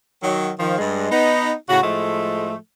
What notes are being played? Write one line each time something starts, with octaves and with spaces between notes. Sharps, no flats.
D#3 F#3
D#3 F3
G2 G3 G#3
B3 D#4
A2 C#3 F#4
A2 F3 G#3 A3